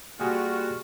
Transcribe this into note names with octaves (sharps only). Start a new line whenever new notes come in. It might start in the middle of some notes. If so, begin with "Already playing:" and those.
G3 A#3 F4 F#4 G#4 G#5